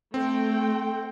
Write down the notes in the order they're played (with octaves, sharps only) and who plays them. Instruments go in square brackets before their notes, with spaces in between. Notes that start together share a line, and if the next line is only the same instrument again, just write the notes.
[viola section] A3 G5 [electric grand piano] C4